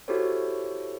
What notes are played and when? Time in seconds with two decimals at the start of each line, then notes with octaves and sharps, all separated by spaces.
0.08 E4 F#4 G4 A4 C5 C#5